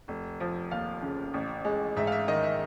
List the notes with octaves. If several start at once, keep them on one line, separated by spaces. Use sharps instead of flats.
F1
F3
D#2 F5
C#3
A1
G#3
G#2 E5
F5
E5
D#3 D#5
E5